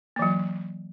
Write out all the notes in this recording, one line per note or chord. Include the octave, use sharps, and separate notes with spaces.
E3 F#3 A#3